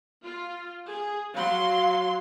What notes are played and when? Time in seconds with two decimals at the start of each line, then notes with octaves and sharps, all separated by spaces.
0.23 F4
0.90 G#4
1.35 F#3 F5 C6